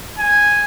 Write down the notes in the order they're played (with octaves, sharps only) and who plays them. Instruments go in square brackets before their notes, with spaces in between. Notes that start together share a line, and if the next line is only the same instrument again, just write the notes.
[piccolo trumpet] G#5